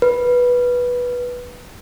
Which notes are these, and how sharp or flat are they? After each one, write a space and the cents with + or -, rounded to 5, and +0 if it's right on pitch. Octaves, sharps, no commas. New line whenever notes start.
B4 -10